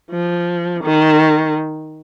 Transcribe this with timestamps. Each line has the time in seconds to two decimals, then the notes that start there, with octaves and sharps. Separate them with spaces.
0.11 F3
0.84 D#3